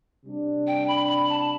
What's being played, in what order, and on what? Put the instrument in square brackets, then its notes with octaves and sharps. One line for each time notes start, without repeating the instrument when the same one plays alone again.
[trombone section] C3 G3 D4
[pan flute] G5
B5
B5
A5